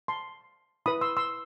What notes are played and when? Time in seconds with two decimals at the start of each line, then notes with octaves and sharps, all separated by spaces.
0.08 A5 C6
0.86 E4 B4 B5 D#6
1.01 C6 E6
1.17 C6 E6